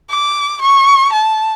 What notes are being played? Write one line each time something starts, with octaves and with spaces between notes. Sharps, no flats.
D6
C#6
A5